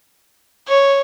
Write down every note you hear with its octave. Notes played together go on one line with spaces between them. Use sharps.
C#5